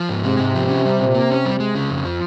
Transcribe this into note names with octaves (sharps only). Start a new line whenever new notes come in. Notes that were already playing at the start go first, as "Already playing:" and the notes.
Already playing: F3
G#2
C3 G#3
G#2
F3
C#4
G3
A#2
A#3
C#4
G3
G#3
C#3
F2
F3